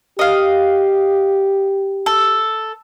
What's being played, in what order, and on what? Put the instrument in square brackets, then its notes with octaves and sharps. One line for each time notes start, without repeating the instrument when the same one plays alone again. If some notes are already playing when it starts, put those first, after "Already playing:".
[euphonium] G4 [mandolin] D#5 F5
[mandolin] A4